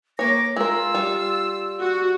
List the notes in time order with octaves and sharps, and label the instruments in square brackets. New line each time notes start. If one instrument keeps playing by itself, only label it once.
[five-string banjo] A#3 C#5 [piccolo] D6 [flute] A#6
[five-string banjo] G#3 A#4 [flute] F4 [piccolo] E6
[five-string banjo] G3
[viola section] F#4